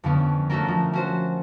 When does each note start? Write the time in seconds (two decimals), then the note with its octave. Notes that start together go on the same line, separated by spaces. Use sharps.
0.04 F2 D3 F3 B3 C#4
0.50 A3 C#4 F#4 A4 A#4
0.68 F3
0.93 C#4 F#4 C5